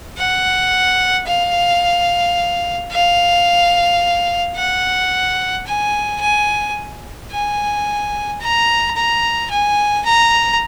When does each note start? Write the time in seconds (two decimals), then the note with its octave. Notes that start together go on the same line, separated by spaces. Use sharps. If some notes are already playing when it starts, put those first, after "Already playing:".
0.17 F#5
1.27 F5
2.92 F5
4.56 F#5
5.66 G#5
6.21 G#5
7.31 G#5
8.40 A#5
8.96 A#5
9.50 G#5
10.05 A#5